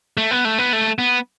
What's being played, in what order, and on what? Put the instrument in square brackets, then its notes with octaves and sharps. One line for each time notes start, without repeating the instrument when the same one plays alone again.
[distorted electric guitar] A3
B3
A3
B3
A3
B3